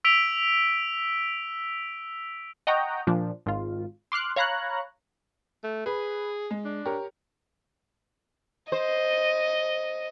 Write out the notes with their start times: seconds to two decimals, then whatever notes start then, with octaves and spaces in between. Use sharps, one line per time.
0.04 E6 B6 D7 F7 G7
2.67 D#5 F#5 G5 A#5 C#6
3.07 A#2 F3 D4
3.46 G#1 F4
4.12 C6 D6 F6 F#6
4.36 C#5 F5 A#5 B5 F#6
5.64 A3
5.86 G#4 B4
6.51 G#3
6.65 D4
6.85 G4 A#4 C#5
8.72 C5 D#5